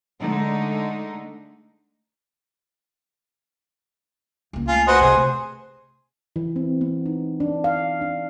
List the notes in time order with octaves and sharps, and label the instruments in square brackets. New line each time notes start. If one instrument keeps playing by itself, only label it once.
[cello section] D3 G#3 A3 D#4
[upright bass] C#2 A#3
[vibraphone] A3 G#5 [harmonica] F4
[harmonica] F#4 B4 D#5 [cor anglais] C5
[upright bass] C3 [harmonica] G#4
[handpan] E3
C4
B3
D#4
D4
F5
D4